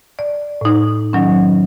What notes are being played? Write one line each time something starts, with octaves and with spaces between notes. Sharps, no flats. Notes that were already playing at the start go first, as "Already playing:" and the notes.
D5
A2 D#4
D#3 F#3 C#4